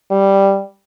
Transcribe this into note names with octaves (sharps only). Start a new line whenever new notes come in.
G3